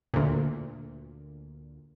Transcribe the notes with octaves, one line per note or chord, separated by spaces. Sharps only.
D2 A#2